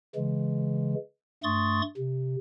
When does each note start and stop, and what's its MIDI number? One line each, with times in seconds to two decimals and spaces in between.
0.15 0.95 49
0.15 0.95 52
0.15 0.95 56
1.44 1.82 43
1.44 1.82 57
1.44 1.82 84
1.44 1.82 85
1.44 1.82 87
1.44 1.82 93
1.97 2.36 48